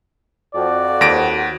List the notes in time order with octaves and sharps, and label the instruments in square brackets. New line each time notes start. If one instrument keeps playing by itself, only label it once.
[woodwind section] F2 [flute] F#4 [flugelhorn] D5
[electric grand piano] D#2 A#6 D7